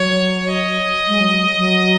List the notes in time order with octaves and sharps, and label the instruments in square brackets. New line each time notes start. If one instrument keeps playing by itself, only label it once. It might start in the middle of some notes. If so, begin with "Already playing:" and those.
Already playing: [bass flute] F#3 [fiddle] C#5
[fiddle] D#5
[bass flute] G#3
F#3
F#3